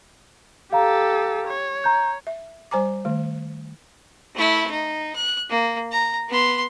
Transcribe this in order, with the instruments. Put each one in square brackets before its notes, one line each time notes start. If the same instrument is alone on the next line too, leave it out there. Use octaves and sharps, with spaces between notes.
[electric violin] G4 A4 [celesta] F5 A#5
[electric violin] C#5
[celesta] A#5 G6
[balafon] E5
G3 C5 G#5 A#5 D6
D#3 A3
[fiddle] A3 E4
D#4
F#6
A#3
A#5
B3 C6